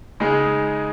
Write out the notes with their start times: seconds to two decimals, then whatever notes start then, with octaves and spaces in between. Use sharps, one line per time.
0.20 C#3 G#3 D#4 G#4